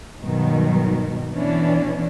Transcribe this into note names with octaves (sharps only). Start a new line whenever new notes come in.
G2 B2 D#3 F#3
B2 E3 C#4 D4